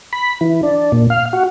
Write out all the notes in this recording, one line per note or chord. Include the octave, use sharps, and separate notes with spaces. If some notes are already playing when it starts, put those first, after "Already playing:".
B5
E3
D4
A#2
F5
F#4